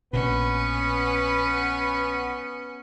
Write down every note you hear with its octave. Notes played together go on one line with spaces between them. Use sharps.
A#1 B2 B3 C#4 B4